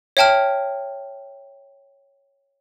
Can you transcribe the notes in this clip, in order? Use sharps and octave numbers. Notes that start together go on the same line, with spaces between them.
C#5 E5 G5 A5 F6